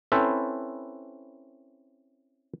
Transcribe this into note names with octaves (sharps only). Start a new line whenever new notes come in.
C4 C#4 E4 A4 B4 C5